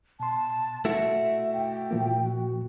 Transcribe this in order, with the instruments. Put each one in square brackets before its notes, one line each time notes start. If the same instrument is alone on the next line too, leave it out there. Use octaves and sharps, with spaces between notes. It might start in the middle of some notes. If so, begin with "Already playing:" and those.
[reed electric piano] B2 C6 [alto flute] A5
[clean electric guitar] A3 E4 F#4 [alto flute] E5
[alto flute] G5
[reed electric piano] A#2 F3 A#3
[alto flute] F#4